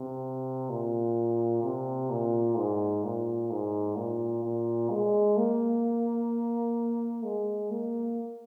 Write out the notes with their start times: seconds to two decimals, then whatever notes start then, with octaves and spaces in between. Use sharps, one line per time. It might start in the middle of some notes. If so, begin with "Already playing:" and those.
Already playing: C3
0.70 A#2
1.63 C3
2.10 A#2
2.57 G#2
3.04 A#2
3.51 G#2
3.96 A#2
4.44 A#2
4.90 G#3
5.37 A#3
7.24 G#3
7.70 A#3